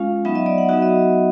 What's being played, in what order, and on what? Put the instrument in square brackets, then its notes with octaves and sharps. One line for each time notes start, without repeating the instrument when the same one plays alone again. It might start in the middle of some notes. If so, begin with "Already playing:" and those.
Already playing: [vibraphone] G#3 C#4 F4 F5
F#3 B3 D#4 E5
D#5
D5
F#5
F#3 B3 D#4 F#4 E5
D#5